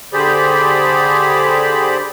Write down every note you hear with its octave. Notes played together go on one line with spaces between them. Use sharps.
D3 G4 G#4 C5 D5 B5